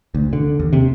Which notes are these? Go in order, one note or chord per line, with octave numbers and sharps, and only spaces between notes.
D2
D3
D#2
C3